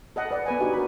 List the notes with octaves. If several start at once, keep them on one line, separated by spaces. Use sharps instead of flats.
A4 D#5 F#5
B4 D5 F#5
B3 B4 G#5
D4 D#4 F#4 G4
A#4 B5